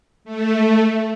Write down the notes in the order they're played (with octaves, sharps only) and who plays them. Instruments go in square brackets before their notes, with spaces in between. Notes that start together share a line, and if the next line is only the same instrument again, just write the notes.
[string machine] A3